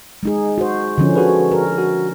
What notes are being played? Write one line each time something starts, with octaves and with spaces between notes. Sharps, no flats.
G#3 D#4 G#4
F#4 C5
D3 F3 C#4
F#4 G#4 B4
A#4
F#4